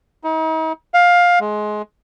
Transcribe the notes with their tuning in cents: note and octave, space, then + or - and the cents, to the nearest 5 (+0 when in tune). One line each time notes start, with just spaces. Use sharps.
D#4 +40
F5 +15
G#3 +20